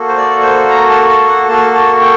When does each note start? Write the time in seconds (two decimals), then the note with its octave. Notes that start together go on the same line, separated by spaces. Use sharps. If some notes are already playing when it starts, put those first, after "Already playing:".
Already playing: A#3 F#4 A4
0.08 C5
0.17 D5
0.43 C5
0.70 A#5
0.90 A5
1.09 A5
1.29 F#5
1.48 A#3 F#4 A4 A5
1.74 A5
2.01 G5